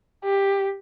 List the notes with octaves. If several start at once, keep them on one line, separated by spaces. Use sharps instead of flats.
G4